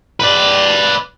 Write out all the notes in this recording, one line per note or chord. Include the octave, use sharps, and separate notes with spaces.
B4 D5